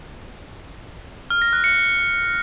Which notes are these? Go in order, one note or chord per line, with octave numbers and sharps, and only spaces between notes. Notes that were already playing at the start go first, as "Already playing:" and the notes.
F6
A#6
F#6
C#7